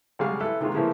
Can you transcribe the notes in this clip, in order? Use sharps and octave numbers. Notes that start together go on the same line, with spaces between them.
B1 C#3 G3 G#3 G#4 F5
E3 E4 A4 B4
C3 D#3 G#3 F4
A2 C#3 E3 F3 A#3